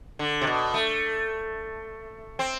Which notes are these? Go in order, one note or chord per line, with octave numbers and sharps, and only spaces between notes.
D3
C3
B2
A3
C4